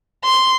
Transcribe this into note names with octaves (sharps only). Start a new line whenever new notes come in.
C6